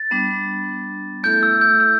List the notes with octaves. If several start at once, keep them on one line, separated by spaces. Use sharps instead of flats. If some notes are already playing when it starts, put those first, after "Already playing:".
Already playing: A6
G3 B3 D4
A3 E4 A4 E5 G6
E6
G6
G6